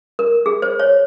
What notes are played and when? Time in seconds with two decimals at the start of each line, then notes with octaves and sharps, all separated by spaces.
0.19 A#4
0.46 G#4
0.62 C5
0.80 C#5